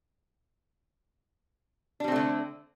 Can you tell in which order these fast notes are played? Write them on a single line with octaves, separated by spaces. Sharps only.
D4 G3 C4 A3 D3